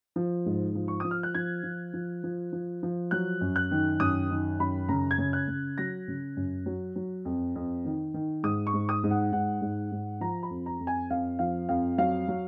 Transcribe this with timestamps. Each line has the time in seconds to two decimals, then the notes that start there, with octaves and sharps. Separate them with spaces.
0.16 F3
0.46 G#2
0.75 F3
0.88 C#6
1.00 F3 D#6
1.11 F6
1.23 F#6
1.35 F3 G#6
1.63 F3
1.94 F3
2.24 F3
2.53 F3
2.83 F3
3.11 F#3 F#6
3.41 F#2
3.56 F#6
3.71 D#3
4.00 F#2 D#6
4.31 D#3
4.59 F#2 B5
4.89 C#3 A#5
5.11 G#6
5.18 C#3
5.33 F#6
5.48 C#3
5.78 F#3 A#6
6.08 C#3
6.37 F#2
6.66 F#3
6.96 F#3
7.25 F2
7.56 F2
7.85 D#3
8.14 D#3
8.43 G#2 D#6
8.67 C#6
8.73 G#2
8.89 D#6
9.04 G#2
9.10 F#5
9.32 G#2 F#5
9.62 G#2
9.92 G#2
10.21 F3 A#5
10.43 B5
10.50 F2
10.66 A#5
10.80 F2
10.87 G#5
11.10 F2 F5
11.39 F3 F5
11.69 F2 F5
11.98 F#3 F5
12.28 F#3